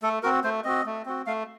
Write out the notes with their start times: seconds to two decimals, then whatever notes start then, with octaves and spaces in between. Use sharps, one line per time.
0.02 A3 A4
0.23 C4 F#4 A#4
0.44 A3 C5
0.64 C4 F#4 D#5
0.86 A3
1.06 C4 F#4
1.27 A3 F5